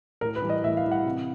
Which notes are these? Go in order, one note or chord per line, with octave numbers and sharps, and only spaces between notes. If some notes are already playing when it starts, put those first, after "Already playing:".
A2 A#4
B4
E3 G3
D#5
A2 E5
F5
E3 G3
F#5
C3